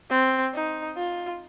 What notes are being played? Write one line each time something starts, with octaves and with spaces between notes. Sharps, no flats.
C4
D#4
F4